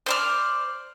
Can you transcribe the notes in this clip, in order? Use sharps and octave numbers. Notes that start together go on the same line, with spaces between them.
C5 D5 F6